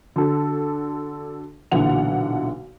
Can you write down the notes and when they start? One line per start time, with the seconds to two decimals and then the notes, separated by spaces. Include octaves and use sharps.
0.16 D3 F#4 A4
1.71 B1 A#2 D3 E3 F#5 F7